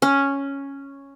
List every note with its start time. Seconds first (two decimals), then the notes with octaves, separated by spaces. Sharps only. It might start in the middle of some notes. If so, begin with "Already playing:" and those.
0.02 C#4